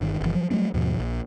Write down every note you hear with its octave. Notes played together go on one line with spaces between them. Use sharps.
G1 D#3
F#1 B2 E3
F3 F#3
F#3 G3 A3 C4
D#2 G#2 B2 F3
A#1